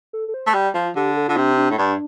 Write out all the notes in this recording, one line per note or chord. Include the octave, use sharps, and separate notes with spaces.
A4
A4
C5
A3
G3 D5
F3 F4
D3 G4
A4
D3 F4
C3 D4
D4
A2
G2 D4